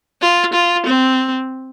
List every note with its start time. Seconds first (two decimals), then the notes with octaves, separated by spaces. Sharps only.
0.21 F4
0.53 F4
0.86 C4